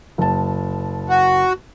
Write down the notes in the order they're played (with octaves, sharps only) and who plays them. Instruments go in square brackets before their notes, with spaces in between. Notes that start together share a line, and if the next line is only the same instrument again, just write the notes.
[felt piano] F#1 A5
[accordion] F#4